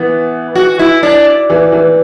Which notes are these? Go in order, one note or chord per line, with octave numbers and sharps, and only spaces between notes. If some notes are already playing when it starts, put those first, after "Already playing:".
Already playing: E3 B3
F#4
E4
D4
E3
E3